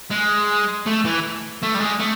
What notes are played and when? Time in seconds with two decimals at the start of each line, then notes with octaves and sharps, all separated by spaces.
0.11 G#3
0.87 A3
1.05 E3
1.63 A3
1.75 G3
1.80 G#3
2.00 A3